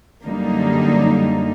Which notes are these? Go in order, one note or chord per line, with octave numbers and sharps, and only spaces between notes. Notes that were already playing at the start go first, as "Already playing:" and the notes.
F#2 D3 G3 A#3 D#4